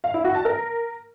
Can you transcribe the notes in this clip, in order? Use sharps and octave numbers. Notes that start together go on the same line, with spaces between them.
F5
E4
F#4
A5
A#4